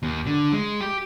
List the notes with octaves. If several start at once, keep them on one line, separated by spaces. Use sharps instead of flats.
D#2
D3
G#3
G4